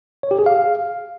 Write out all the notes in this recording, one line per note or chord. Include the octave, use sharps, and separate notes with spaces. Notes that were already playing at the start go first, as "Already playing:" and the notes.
C#5
G4
G#4
F5